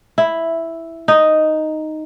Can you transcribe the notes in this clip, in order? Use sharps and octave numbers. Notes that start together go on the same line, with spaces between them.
E4
D#4